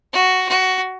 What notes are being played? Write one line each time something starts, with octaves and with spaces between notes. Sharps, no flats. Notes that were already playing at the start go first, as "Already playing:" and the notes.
F#4
F#4